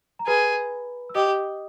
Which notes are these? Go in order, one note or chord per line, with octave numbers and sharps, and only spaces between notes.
A#5
G#4 B4 B5
E6
G4 D#5 D#6